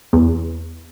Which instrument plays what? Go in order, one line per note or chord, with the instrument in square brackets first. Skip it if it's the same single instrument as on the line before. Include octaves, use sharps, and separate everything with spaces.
[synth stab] E2